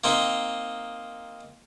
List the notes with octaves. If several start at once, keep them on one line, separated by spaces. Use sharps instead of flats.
A#3 C4 D#4